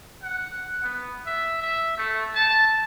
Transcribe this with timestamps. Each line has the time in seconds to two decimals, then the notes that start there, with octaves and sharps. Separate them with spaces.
0.23 F#5
0.83 B3
1.26 E5
1.61 E5
1.97 A3
2.35 A5